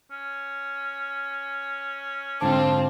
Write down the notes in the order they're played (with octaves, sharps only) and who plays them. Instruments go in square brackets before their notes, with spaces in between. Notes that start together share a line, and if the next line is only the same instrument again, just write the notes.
[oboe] C#4
[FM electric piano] G#2 D3 D6 [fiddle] C4 F4 [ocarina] A5